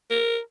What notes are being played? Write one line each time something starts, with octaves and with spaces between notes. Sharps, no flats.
A#4